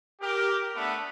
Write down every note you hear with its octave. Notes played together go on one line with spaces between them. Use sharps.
G4 A#4
A3 B3 D4 B4